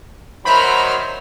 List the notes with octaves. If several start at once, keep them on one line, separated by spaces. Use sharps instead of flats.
D#3 F#3 C5 E5 B5 F6